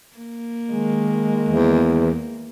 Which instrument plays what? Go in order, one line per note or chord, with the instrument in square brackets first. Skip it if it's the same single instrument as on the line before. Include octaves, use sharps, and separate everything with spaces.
[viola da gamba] A#3
[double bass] D#3 G#3
[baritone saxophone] E2